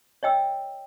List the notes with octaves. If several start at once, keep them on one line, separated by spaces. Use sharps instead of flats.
C#5 D#5 G5 E6